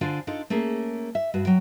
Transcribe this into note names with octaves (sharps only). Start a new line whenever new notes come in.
D3 D4 F4 C5 G#5
D4 D#4 F4 A4
A3 A#3 C#4 G#4 A#4
E5
G2 F#4 B4
F#3 G5